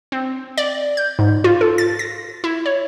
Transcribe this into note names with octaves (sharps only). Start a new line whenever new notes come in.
C4
D5
G6
G#2
F4
A4
A6
A#6
E4
C#5